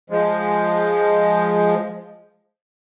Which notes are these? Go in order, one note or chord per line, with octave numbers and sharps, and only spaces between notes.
F3 G#3